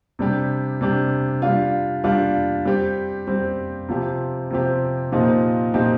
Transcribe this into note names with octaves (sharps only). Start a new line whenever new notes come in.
C3 G3 D4 G4
C3 G3 D4 G4
G3 D4 F4
G3 D4 F4
G3 C4 G4
G3 C4 G4
C3 F3 C4 G4
C3 F3 C4 G4
A#2 F3 C4 D#4 G4
A#2 F3 C4 D#4 G4